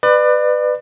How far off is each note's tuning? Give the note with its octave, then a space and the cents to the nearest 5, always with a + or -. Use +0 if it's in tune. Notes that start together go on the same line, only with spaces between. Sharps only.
B4 +10 D5 +35